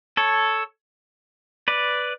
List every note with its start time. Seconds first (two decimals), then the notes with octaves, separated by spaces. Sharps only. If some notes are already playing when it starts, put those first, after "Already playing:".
0.17 A4 C#5
1.68 B4 D5